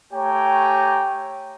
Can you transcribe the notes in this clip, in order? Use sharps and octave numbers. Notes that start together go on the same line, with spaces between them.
A3 G4 C#5 G5 G#5 A#5